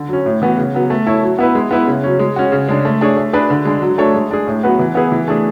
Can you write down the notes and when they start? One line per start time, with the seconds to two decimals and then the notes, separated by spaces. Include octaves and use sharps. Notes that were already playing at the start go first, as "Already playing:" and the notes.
Already playing: D3
0.08 F#3 C#4
0.26 A2
0.42 E3 B3 F#4
0.57 C#3
0.74 F#3 B3
0.90 A3
1.06 E4 A4 C#5
1.23 F#3
1.39 B3 E4 B4
1.55 G#3
1.71 B3 E4 B4
1.87 C#3
2.03 F#3 C#4
2.19 G#3
2.36 C#4 F#4
2.52 C#3
2.68 G#3 D4
2.85 A3
3.01 D4 G#4 C#5
3.16 A3
3.33 D4 G#4 B4
3.50 D3
3.65 G#3 D4
3.82 F#3
3.98 A3 D4 A4 C#5
4.14 G#3
4.31 D4 G#4
4.47 A2
4.63 F#3 B3 F#4 B4
4.79 E3
4.95 B3 E4 G#4 B4
5.12 E3
5.28 A3 D4 G#4